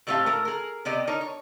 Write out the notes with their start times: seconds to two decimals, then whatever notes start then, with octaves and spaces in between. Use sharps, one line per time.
0.07 A2 G3 A3 C4 G4 F5
0.26 A2 A3 A#4
0.45 G#4 A#4
0.85 C3 B3 G4 D5 D#5
1.07 D4 D#4 A#4 C#5
1.21 C#5